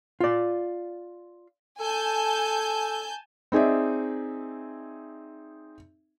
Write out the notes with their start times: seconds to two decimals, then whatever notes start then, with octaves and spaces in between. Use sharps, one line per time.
0.20 F4 D5
1.80 A4 G#5 A5 G6
3.52 C4 D#4 G#4 D5 E5